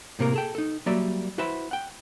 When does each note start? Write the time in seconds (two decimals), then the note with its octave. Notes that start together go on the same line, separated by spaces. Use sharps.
0.19 A2 C3 A#3 A#4
0.33 G#4 A4 G5
0.55 D#4 A4
0.86 F#3 G3 A#3 D5 E5
1.38 E4 F#4 B4 C5 E5 B5
1.71 F#5 G5